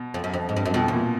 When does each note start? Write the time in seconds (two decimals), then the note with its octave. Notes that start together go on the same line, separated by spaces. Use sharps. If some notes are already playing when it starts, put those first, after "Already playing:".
Already playing: B2
0.14 F2
0.24 F#2
0.34 F2
0.49 G#2
0.56 G2
0.65 F#2
0.74 F2 B2
0.88 E2 A#2